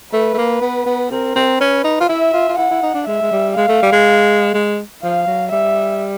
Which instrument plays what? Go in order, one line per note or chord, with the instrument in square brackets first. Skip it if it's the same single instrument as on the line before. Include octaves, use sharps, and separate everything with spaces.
[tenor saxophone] A3 [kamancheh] B4
[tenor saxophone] A3
A#3
B3
B3
[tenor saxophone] C4 [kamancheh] A#4
[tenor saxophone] C4
[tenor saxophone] C#4 [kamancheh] B4
[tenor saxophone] D#4
F4
[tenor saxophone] E4 [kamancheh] E5
[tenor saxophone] F4
F4
[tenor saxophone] E4 [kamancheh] F#5
[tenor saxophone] E4
D#4
D4
[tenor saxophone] G#3 [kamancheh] E5
[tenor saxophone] G#3
G3
[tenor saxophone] G#3 [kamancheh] F5
[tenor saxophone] A3
G3
G#3
G#3
[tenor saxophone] F3 [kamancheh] F5
[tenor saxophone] F#3
[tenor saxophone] G3 [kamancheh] E5